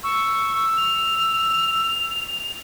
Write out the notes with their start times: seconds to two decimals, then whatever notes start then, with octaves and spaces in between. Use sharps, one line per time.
0.03 C#6 E6
0.77 F7